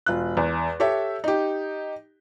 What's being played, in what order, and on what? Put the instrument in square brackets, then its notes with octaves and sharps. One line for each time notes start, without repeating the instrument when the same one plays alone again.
[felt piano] E1 F4 F#6
E2
G4 A4 C#5 E5
D#4 G4